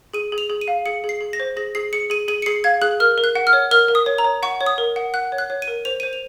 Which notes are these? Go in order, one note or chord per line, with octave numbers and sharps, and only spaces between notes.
G#4 D#7
G#4
F7
G#4
D#7
F5
G#4 C#7
G#4
C7
G#4
A#6
C5
G#4 A#6
G#4 C7
G#4 C#7
G#4 D#7
G#4 D#7
C#7
G#4 C7
F5 G#6
G#4 F#6
A#4 F6
A#4
F#6
F#5
F6
C#5
A#4 F6
A#4
D#6
C#5
A#5
C#5
F#5 C#6
C#5
D#6
A#4
F#5
F#5 F#6
C#5
F#6
C#5
D#7
A#4
C5 F7
C5 D#7
F7